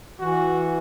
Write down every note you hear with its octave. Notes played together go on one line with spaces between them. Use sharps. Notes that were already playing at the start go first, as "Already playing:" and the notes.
E3 F#4